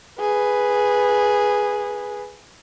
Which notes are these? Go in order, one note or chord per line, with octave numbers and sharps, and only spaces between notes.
G#4 B4